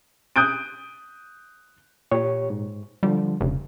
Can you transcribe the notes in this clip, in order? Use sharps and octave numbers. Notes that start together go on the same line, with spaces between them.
D#6 F#6 G6 D7
A#2 G4 C#5
G#2
D3 F3 G3
F1 C#3